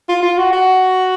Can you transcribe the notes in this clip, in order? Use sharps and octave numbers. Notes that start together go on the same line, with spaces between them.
F4
F4
F#4
F#4